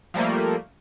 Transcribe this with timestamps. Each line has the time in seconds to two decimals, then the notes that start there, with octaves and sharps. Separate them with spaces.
0.14 F3 G3 A3 A#3